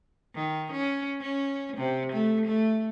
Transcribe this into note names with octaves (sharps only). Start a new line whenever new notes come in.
D#3
C#4
C#4
C3
A3
A3